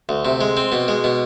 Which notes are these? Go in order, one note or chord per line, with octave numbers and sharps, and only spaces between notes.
D2
C3
G#3
C4
B2
G#3
B2